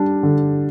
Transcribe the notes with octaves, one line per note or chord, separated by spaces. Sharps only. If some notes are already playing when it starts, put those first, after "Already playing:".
Already playing: G3 D4
D3